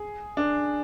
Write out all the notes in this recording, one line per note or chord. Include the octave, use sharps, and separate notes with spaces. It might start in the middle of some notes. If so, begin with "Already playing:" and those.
Already playing: G#4
D4